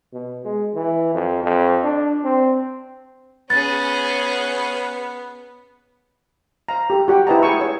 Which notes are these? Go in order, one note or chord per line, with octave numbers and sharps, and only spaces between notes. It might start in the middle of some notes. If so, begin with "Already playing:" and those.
B2
G#3
E3
F2
F2
D4
C4
B3 C#4 G#4 C#5 A6
C5 F5 A#5
G4 A4
F#4 G4 F#5 G5
E4 B4 C5 D#5 A5 A#5
G#4 G#5 C#6 E6
A4 C#5